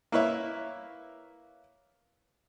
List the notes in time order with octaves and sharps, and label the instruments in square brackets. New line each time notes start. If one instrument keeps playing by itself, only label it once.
[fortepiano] A#3 E4 B4 C#5 E5